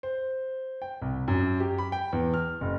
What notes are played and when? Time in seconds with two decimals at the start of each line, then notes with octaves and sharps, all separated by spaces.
0.03 C5
0.82 G5
1.02 C2
1.28 F#2
1.60 G4
1.78 B5
1.92 G5
2.13 E2
2.34 F6
2.61 F#1